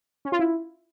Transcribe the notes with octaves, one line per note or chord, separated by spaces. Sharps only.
C#4
F4
E4